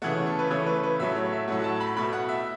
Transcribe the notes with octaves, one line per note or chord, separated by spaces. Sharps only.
C#3 E3 A3 F#5
C#5
A4
B4
C#3 E3 A3 C#5
B4
B4
A2 F#3 A3 E5
C#5
E5
A2 F#3 A3 F#5
F#5
A5
B5
B2 A3 B5
F#5
E5